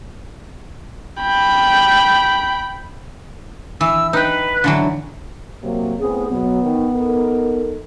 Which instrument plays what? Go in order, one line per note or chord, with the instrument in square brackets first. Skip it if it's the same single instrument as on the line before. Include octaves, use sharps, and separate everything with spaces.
[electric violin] G5 B5
[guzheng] E3 [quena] E6
[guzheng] D#4 G5 [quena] B4
[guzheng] D3 E3 F#3
[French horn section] C3 F#3 A#3
[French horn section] A2 B3 C4 [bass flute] G#4
[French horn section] B2 F#3 [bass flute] B3
[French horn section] D#3
D#4 A4 A#4